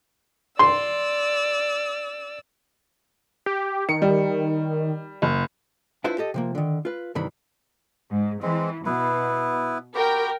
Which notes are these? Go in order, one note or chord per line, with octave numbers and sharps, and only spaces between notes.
D5 C6 E6
G4
D#3 C#7
G3
F#1
D4 E4 F4 B4 C5 E5
G4 A4 D#5
C3 F3 A#3
D3 D#3
F4 B4
G2 C3 D#3 E3 B5
G#2
E3 G#3 C4
B2 B3 E4 B4
F#4 G4 A#4 G5 B5